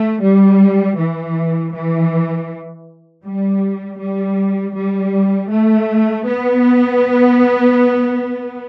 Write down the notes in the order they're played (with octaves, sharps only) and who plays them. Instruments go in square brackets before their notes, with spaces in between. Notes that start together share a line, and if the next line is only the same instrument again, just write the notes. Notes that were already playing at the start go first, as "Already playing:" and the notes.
Already playing: [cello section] A3
G3
E3
E3
G3
G3
G3
A3
B3